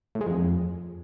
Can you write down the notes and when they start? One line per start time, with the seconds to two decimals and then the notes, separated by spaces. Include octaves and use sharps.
0.15 A2
0.21 G#3
0.26 F2